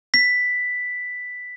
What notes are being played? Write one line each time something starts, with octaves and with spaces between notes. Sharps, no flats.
B6